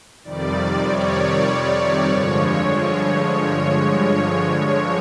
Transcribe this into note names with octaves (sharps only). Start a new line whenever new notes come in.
F2 C3 D#3 G3 D5
D5
C#5
G2 D3 F3 G#3